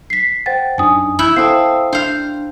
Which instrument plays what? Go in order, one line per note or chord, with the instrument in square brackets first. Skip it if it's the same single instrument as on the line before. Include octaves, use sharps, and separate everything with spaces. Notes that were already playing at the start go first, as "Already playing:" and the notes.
[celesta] B6 C7
[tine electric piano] C5 F#5 G5 [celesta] A6
[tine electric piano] F#2 D4 D#4 [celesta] G#5 D#6
[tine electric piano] A1 F#6 G6 [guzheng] E4
[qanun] C4 A4 [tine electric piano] F5 D#6 E6 [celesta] C7
[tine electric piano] D4 [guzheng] C5 F5